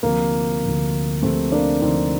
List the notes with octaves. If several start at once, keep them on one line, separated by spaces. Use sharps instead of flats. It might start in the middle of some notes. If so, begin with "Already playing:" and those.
D2 C3 F3 A#3
D2 C3 F3
D2 C3 F3 A3 C4
A#3 D4
D2 C3 F3 C4 D#4